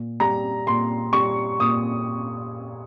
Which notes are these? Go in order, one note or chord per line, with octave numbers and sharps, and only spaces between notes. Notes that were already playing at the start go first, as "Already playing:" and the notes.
Already playing: A#2
G3 A#5
A#2 C6
G3 C#6
A#2 D#6